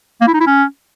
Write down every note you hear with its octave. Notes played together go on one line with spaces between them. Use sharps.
A#3
E4
D#4
E4
C#4